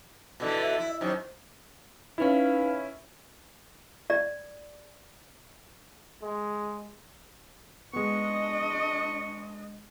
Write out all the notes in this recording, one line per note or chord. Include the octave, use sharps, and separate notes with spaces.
B2 D3 E3
E5
E4
F#2 D#3 C5
C#4 D#4 E4 B4 F5
D5
G#3
G#3 B3 D4 D#5 C#6